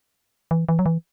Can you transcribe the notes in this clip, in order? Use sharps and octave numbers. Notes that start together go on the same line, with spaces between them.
E3
E3
F#3
E3